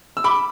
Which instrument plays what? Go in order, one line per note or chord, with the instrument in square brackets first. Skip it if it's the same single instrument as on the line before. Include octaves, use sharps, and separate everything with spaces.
[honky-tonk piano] E6
B5 D6